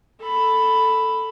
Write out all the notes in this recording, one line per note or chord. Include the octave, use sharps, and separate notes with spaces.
A4 B5